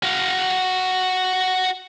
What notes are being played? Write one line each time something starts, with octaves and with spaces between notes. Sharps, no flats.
F#4 F5